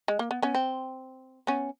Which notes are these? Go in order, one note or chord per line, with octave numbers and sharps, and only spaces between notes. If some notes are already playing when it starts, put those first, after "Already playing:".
G#3
A#3
B3
B3 C#4
C4
B3 C#4